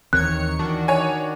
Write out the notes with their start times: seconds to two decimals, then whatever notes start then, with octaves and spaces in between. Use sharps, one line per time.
0.13 D#2 D#3 E3 C4 C#5 F#6 C#7
0.59 D#3 E3 D4 F#4
0.88 C#5 G#5